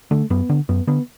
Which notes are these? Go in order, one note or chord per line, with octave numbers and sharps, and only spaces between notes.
D3 A3
F#2 B3
D3
F#2 B3
D3 B3